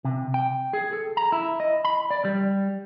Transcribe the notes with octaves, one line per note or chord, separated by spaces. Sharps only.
C3
G5
G#4
A4
A#5
E4
D#5
B5
D5
G3